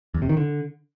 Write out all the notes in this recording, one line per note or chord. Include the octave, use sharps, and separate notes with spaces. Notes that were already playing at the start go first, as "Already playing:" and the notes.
E2
C3
D#3
D3